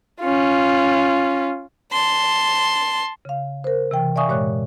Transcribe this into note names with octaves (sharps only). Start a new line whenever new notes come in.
C#4 F4
A5 C6
C#3 F5
A#4 C5
C3 E3 G5
D5 E5 F5 G#5 C#6 D#6
G2 A#2 G#3 C#5 C#6 F#6